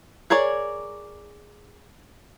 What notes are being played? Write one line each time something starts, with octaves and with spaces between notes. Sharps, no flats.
G#4 A#4 C#5 D5